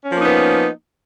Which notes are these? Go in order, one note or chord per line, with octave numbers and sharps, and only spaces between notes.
F3 A#3 B3 C#4 D#4